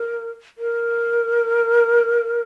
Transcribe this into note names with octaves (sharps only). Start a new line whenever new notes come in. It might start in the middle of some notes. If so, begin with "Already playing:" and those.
Already playing: A#4
A#4